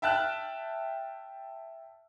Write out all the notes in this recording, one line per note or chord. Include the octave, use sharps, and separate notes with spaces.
E5 G5 A5 F6 F#6